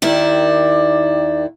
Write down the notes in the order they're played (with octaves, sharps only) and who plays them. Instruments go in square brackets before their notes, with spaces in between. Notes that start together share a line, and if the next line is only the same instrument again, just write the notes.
[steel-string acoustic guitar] D#2 D#3 E4 [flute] D5